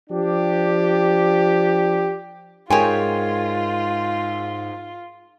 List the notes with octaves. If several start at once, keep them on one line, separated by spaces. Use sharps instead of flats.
F3 D4 G4
G#2 F4 G#4 A#4 C#5 G5 G#5 C6